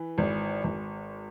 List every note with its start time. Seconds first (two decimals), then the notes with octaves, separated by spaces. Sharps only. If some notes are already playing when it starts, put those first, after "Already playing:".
Already playing: E3 B4
0.18 G#1
0.64 G#1